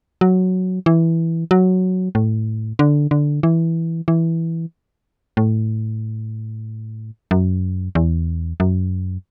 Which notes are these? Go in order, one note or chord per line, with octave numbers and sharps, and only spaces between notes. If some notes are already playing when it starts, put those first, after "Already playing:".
F#3
E3
F#3
A2
D3
D3
E3
E3
A2
F#2
E2
F#2